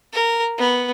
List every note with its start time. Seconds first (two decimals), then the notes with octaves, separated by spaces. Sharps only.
0.13 A#4
0.58 B3